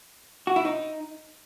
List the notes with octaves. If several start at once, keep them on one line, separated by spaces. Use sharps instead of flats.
F#4
E4
D#4